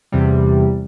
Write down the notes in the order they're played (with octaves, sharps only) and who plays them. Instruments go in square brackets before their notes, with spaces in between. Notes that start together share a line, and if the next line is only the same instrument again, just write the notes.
[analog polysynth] E2 C3 G3